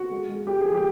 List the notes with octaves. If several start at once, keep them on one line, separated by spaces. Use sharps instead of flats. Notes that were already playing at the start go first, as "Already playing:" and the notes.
Already playing: F#4
G#3
G#3
G#3 G4
F3 G#4
G4